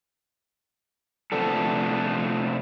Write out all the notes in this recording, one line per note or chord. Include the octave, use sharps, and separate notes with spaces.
C3 F3 A3 B3 D4 A4